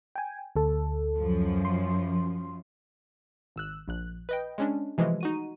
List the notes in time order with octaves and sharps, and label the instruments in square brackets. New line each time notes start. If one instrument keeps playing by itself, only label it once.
[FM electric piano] G5 G#5
D2 A4
[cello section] F#2 F3
[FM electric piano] C6
[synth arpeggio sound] G#1 E6 F#6
A#1 F#6
B4 D#5 G5
G#3 C#4 D4
C3 E3 F3 G#3 A3
D#4 F#4 D#7